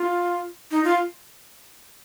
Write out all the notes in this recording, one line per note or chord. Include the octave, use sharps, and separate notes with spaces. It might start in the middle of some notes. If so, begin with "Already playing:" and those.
Already playing: F4
D#4
F4